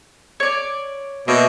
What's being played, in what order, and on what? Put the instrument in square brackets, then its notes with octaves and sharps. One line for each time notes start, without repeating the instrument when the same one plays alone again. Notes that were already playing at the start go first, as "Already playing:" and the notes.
[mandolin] C#5 D5
[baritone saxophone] B2 [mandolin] A#3 C#5 E5